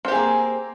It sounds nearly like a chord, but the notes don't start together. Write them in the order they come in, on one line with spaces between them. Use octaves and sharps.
C4 G4 G#4 A#3